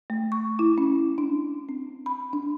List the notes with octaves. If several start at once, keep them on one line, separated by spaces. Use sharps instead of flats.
A3
C#6
E4
C#4
D4
C4
B5
D4